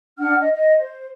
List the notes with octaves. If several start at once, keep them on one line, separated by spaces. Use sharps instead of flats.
D4 F#5 F6
D#5
D#5
C5